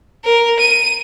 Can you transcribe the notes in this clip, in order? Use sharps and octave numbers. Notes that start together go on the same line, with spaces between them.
A#4
D#7